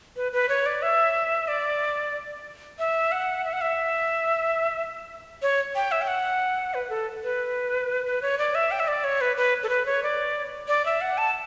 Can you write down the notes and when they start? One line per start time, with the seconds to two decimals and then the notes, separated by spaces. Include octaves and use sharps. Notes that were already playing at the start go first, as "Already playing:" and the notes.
0.16 B4
0.32 B4
0.49 C#5
0.66 D5
0.82 E5
1.48 D5
2.79 E5
3.12 F#5
3.44 E5
3.53 F#5
3.61 E5
5.42 C#5
5.75 G5
5.92 E5
6.02 G5
6.08 F#5
6.74 B4
6.90 A4
7.23 B4
8.06 B4
8.22 C#5
8.38 D5
8.55 E5
8.71 G5
8.80 E5
8.88 D5
9.04 C#5
9.21 B4
9.37 B4
9.63 A4
9.69 B4
9.86 C#5
10.03 D5
10.68 D5
10.85 E5
11.01 F#5
11.18 A5